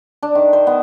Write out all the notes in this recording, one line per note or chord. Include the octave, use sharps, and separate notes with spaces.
D4
D#3
C5
B3